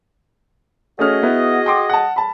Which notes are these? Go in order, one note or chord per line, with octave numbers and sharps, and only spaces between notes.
A3 C#4 F#4 G#4 D#5 F6
B3 E4 B4
G5 C6 D6
F#5 A5
A5 B5